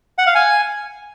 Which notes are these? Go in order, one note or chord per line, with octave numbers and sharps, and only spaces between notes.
F#5
F5
G#5